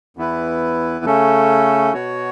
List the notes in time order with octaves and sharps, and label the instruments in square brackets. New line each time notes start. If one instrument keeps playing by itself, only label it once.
[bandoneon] E2 E3 B3 E4 B4
C#3 A3 C#4 A4
B2 B3 F#4 C#5